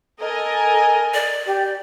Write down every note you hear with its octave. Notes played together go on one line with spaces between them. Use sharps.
A4 A#4 D#5 G#5
D5
G4